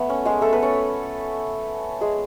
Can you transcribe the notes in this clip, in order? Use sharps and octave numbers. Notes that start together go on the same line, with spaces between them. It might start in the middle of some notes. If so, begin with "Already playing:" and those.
Already playing: A3 B3
C#4
G#3 G#4
A3 A4
B3 B4
C#4 C#5
G#3 G#4